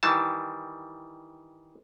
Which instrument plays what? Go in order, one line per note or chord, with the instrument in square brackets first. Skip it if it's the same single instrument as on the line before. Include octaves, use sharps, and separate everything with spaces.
[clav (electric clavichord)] D#3 E3 G3 A5